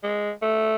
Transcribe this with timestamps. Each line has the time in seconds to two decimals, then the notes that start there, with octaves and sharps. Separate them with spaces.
0.03 G#3
0.42 A3